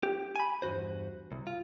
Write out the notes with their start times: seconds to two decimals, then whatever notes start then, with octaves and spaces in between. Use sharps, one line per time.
0.03 G4
0.36 G#5 B5
0.62 E2 G2 B2 F#4 C5
1.32 C2
1.47 F4